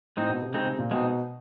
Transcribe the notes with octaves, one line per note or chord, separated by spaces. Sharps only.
A2 G#3 C4 D#4
B2
C3
C#3 G#3 C4 D#4
C3
A#2
B2 G#3 C4 D#4